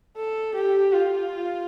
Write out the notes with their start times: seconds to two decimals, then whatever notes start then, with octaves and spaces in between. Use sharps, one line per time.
0.17 A4
0.55 G4
0.93 F4